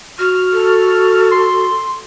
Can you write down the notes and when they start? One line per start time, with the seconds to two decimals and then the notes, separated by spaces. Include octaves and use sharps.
0.19 F#4 F6
0.53 A4
1.31 C6